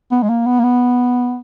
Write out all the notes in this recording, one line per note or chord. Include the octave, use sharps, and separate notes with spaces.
B3
G#3
A#3
B3
A#3
B3